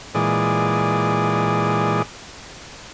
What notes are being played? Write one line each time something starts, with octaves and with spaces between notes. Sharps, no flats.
A#2 E3 G#3 G#4 D5